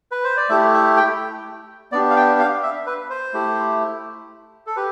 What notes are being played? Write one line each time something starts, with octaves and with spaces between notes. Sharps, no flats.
B4
C5
D5
A3 E4 G4 E5
E5
G5
B3 D4 G4 D5
F5
G5
F5
E5
B4
C5
A3 E4 G4
A4
G4 B4